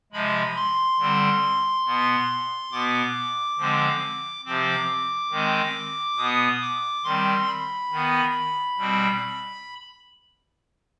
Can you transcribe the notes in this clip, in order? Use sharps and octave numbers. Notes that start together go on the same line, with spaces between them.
C3 F3 G#3 B5
C6
D3 G3 C4
B2 B3
B2 B3 D6
D3 F3 G#3 C4
C3 F3 C4 D6
D#3 G#3 C4
B2 B3 D#6
D6
D#3 G3 C4 C6
B5
D#3 B3
B2 G3 C4